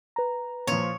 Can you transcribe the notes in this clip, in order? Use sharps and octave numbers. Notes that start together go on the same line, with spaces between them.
B4 A#5
A#2 F3 C#5